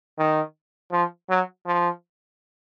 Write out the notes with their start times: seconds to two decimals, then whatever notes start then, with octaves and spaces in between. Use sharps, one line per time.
0.18 D#3
0.92 F3
1.30 F#3
1.66 F3